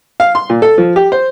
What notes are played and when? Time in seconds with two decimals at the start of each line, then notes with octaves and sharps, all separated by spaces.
0.20 F5
0.35 C6
0.50 A#2
0.62 A4
0.78 F3
0.96 G4
1.12 C5